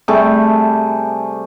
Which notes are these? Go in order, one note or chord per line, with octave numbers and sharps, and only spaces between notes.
C3 G3 A3 G#4